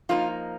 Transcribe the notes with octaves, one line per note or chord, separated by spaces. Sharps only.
F3 A#3 D#4 F4